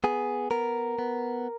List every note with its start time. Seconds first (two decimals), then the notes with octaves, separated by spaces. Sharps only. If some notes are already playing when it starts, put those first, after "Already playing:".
0.04 B3 G#4
0.51 B3 A#4
0.99 B3